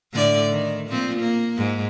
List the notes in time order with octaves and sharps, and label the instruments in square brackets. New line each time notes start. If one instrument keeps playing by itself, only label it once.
[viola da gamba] A2 D3 D5
D#3
A#2 F3 C4
A#3
G#2